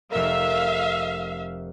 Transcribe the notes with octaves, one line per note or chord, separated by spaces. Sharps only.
F1 A#4 E5 F5